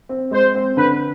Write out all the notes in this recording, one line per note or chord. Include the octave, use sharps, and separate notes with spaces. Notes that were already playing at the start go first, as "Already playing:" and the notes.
C4
G#3 C5
C4
D3 B4